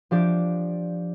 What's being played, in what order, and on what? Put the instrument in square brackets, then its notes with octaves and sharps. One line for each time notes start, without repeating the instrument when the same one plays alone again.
[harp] F3 D4 G4 D5